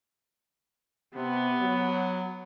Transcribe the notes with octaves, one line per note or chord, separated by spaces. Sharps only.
C3 B3
F#3